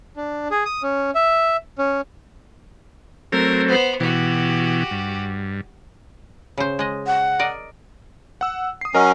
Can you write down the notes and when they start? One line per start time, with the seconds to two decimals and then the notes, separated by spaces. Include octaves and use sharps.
0.16 D4
0.51 G#4
0.65 D#6
0.83 C#4
1.15 E5
1.78 C#4
3.32 F#3 A3 C4 A#4
3.68 B3 C5
4.00 B2 E3 F#4 G4
4.91 G2
6.57 C#3 C5
6.79 G#3 D#5
7.07 F#5
7.39 A#4 D5 D#5
8.41 F#5 E6
8.81 D#6 C7
8.95 F#3 C#4 A#4 D#5